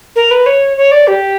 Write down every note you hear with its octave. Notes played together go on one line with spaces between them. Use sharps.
A#4
B4
C#5
C#5
D5
G4